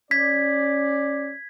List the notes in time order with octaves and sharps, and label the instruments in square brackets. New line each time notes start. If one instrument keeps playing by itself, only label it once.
[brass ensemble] C#4 D5 [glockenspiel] G#6 B6